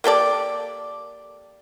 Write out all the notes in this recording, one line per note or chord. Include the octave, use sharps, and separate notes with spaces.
A#3 G4 A4 D5